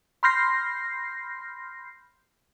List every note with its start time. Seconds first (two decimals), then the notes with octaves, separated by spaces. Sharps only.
0.23 B5 C6 F6 G6 A#6 C7